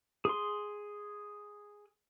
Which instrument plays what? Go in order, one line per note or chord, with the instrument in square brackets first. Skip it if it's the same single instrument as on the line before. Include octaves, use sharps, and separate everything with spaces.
[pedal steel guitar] G#4 C6